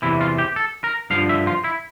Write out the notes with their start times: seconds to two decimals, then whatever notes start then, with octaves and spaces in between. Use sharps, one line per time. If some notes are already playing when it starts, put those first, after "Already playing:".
0.02 E2 C3 E3 E4
0.21 F4
0.38 G4
0.56 A4
0.84 A#4
1.10 G2 D3 F3 F5
1.29 E5
1.47 F4
1.64 E4